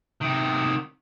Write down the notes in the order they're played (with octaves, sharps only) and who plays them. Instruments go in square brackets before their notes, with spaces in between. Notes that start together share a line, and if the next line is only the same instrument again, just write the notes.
[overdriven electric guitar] C3 D#3